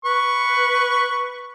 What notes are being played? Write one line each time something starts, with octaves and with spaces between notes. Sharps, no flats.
B4 C#6